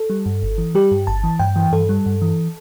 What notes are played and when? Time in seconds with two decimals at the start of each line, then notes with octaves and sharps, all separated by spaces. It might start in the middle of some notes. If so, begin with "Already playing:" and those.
Already playing: A4
0.10 G3
0.26 G2
0.43 G1
0.58 E3
0.75 G3 G4
0.91 G2
1.07 G1 A5
1.24 E3
1.39 G2 G5
1.56 E3
1.72 G2 A4
1.89 G3
2.06 G2
2.22 E3